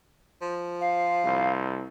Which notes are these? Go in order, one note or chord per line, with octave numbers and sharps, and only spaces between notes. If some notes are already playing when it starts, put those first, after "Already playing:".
F3
F5
C2